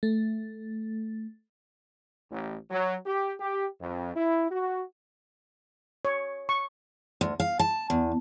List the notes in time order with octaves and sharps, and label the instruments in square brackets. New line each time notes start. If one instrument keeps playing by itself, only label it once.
[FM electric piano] A3
[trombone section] A1
F#3
G4
G4
F2
E4
F#4
[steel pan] C#5
C#6
[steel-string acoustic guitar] D2
F5
A5
E2